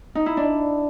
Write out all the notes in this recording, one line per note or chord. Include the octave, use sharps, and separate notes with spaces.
D#4
E4
D4